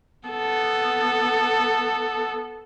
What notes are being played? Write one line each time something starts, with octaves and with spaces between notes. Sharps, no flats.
B3 A4